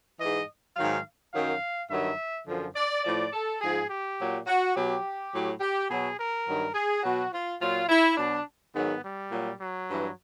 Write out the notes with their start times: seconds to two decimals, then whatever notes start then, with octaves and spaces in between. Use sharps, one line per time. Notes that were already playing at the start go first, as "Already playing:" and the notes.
0.19 G#2 E3 D#5
0.76 G#2 D#3 F#3 F5
1.33 F#2 D#3 F#3 F5
1.90 G2 D#3 F#3 E5
2.47 F#2 D3 F3
2.76 D5
3.04 A2 F3 D5
3.33 A4
3.61 G#2 F3 G#4
3.89 G4
4.18 A#2 F#3
4.47 F#4
4.74 B2 F#3 G4
5.32 A2 F#3
5.60 G4
5.89 B2 F#3 G#4
6.17 A#4
6.46 G2 D#3 F#3
6.74 G#4
7.03 B2 F#3 F#4
7.32 F4
7.60 A#2 F#3 F4
7.89 E4
8.17 B2 F#3 D4
8.74 G#2 D#3 F#3 B3
9.02 G3
9.31 A#2 F#3
9.59 F#3
9.88 G2 E3